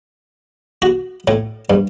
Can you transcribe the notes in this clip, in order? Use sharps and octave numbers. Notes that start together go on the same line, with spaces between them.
F#4
A2
G2